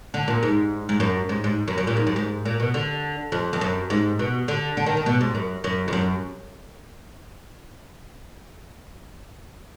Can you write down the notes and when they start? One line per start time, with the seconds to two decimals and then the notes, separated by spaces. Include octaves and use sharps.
0.14 D3
0.28 A#2
0.43 G#2
0.89 G#2
1.00 F#2
1.29 G#2
1.44 G#2
1.68 F#2
1.78 F#2
1.87 A#2
1.97 G#2
2.07 F#2
2.16 G#2
2.45 A#2
2.60 B2
2.74 D3
3.32 F2
3.53 F2
3.61 F#2
3.90 G#2
4.19 B2
4.48 D3
4.77 D3
4.86 D#3
4.97 D#3
5.06 B2
5.21 G#2
5.35 F#2
5.64 F#2
5.88 F2
5.93 F#2